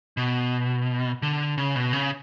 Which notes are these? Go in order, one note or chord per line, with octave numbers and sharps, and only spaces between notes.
B2
D3
C#3
B2
C#3